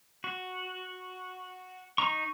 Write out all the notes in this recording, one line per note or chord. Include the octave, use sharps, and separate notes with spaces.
F#4
D#4 A#5 C#6